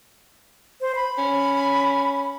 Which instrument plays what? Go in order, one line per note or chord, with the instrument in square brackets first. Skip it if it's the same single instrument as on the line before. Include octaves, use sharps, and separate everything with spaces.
[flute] C5
B5
[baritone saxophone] C#4